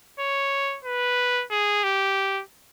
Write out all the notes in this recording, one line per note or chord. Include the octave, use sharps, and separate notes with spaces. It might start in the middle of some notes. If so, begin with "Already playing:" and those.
C#5
B4
G#4
G4